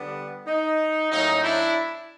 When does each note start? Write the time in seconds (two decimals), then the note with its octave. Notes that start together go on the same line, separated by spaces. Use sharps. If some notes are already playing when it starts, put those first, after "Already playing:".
Already playing: D3 G3 B3 D4
0.46 D#4
1.12 A2 F#3 A#3 C#4 D#4
1.44 D4 E4